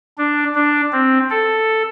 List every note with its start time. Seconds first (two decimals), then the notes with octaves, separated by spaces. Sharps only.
0.18 D4
0.55 D4
0.93 C4
1.30 A4